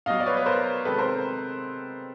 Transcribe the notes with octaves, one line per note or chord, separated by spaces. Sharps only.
B2 F#3 D#5 F5
D5
B4 C#5
B4
A#4 C5
C3 D#3 G#3 A4 B4
A#4 C5